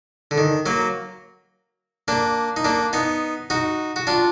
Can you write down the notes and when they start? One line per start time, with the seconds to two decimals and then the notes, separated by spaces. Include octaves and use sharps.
0.31 D3
0.38 D#3
0.66 F#3 A#3
2.08 A#3 D4
2.56 D#4
2.64 A#3 D4
2.93 B3 D#4
3.50 D#4 F#4
3.96 F#4
4.07 D4 F4